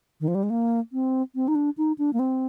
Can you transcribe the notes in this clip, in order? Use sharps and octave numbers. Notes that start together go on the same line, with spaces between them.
D#3
F3
G3
G#3
A#3
C4
C4
D#4
D4
D#4
D4
A#3
C4